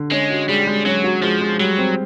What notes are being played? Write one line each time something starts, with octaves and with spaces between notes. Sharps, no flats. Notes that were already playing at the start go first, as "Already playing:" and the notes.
Already playing: D3
G#3 C#4
F#4
G3 G#3
G#3
F#3 C#4
F#4
F3 G#3
G#3
F#3 G3
C4